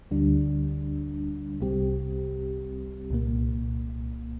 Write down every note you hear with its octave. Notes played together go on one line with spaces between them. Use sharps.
D2 D3 G3 D4
C2 C3 G3 C4 G4
C2 A#2 A#3